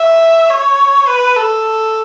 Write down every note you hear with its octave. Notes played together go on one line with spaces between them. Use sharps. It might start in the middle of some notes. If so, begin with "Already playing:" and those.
Already playing: E5
C#5
B4
A4